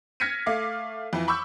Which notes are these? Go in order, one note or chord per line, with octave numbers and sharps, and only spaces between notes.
F6 G#6 A#6 B6 C#7 D#7
A3 F5 D6
F2 E3
B5 C#6 D6 E6 G6